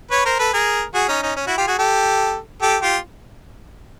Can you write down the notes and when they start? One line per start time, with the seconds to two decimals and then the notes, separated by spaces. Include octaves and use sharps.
0.11 B4 C#5
0.25 A#4 C5
0.39 A4 B4
0.53 G#4 A#4
0.94 F#4 G#4
1.08 C#4 D#4
1.22 C#4 D#4
1.36 C#4
1.47 E4 F#4
1.58 F4 G4
1.67 F#4 G#4
1.79 G4 A4
2.62 G4 A4
2.82 F4 G4